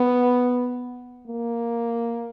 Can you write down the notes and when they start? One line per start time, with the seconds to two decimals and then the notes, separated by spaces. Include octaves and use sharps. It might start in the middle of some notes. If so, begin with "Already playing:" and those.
Already playing: B3
1.28 A#3